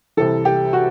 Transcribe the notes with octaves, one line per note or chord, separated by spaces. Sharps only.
C2 C3 E3 A4
G4
F#4